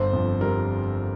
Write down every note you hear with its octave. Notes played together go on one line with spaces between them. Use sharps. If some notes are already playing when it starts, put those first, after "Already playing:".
Already playing: G1 C5
F2
G3 A#4